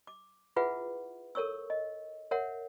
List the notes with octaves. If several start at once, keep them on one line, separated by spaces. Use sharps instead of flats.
D6
E4 F4 G#4 B4 E5 F#5
A4 A#4 C#5 C#6 E6
D#5
A#4 C#5 E5 F#5